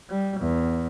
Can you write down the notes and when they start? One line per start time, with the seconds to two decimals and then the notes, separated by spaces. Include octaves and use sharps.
0.10 G3
0.40 E2